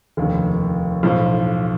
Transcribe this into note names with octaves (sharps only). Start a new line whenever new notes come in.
F1 D#2 D3
B1 A2 F3